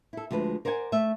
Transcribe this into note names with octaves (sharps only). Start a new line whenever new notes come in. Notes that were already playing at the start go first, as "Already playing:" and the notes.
E4 A4
D2 F3 G#3 B4
A#4 C5 D5 F#5 G#5
A3 E5